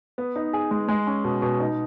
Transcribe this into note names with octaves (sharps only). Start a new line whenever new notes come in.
B3
D#4
G#4
G#3
G#3
C#4
B2
B2
D#4